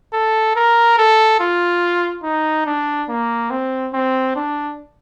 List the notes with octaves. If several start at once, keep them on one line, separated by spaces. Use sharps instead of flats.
A4
A#4
A4
F4
D#4
D4
A#3
C4
C4
D4